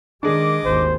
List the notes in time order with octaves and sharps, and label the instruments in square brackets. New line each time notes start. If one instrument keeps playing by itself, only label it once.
[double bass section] D#3 G#3 [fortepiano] D4 G#4 [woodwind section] D#5 D6
[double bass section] G#1 D#2 [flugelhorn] C5